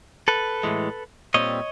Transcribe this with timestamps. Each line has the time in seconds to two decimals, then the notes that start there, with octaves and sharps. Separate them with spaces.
0.28 A4 B4
0.63 A2 E3 G#3
1.34 A#2 G3 C4 C#5 D#5